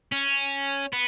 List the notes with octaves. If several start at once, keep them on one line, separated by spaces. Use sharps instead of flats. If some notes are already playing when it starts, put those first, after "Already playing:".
C#4
B3